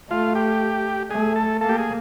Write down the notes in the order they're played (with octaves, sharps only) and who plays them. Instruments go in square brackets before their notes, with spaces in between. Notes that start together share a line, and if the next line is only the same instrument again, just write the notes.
[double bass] A3 [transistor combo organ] F4
[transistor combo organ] G4
[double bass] A3 [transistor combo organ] G#4
[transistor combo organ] A4
[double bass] A#3 [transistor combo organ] A4
[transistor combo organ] G4
G#4